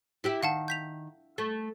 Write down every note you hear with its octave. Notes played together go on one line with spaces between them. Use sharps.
E4 G4 E5
D#3 F5 F#5 A5
G6 B6 F7
A3